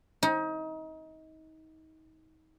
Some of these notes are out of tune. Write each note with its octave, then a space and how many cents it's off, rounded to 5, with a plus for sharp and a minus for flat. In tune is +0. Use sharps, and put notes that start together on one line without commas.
D#4 +30